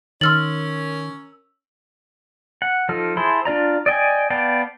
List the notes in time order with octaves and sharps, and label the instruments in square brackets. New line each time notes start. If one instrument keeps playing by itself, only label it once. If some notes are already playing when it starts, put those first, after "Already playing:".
[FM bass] D#3 [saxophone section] C#4 A#4 [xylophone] C6 F6 A6 [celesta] E6 F#7
[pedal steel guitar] F#5
F3 D#4 A4 F6
E4 G#4 C5 A5 C6
D4 F4 D5 A#5
D5 D#5 G5 G#5
B3 D5 F5 G5 A5